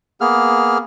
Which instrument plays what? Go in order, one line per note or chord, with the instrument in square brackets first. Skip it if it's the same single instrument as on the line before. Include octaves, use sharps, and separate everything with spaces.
[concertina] A#3 B3 G#4 F6